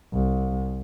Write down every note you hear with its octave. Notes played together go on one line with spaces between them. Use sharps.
C2